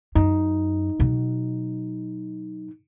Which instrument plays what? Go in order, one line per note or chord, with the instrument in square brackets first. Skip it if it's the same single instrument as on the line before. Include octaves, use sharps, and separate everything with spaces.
[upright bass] F#2 [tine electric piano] D#4
[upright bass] B2 F#3